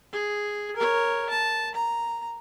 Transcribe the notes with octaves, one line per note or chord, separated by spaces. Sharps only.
G#4
A#4 C#5
A5
A#5